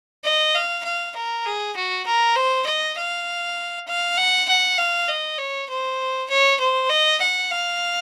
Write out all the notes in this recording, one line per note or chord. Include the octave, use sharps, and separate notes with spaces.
D#5
F5
F5
A#4
G#4
F#4
A#4
C5
D#5
F5
F5
F#5
F#5
F5
D#5
C#5
C5
C#5
C5
D#5
F#5
F5